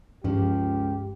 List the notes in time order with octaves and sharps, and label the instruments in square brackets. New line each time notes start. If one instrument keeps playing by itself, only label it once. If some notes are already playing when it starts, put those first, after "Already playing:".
[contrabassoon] C#2 [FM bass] G2 [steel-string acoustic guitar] C#3 F3 G#3 [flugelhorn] G4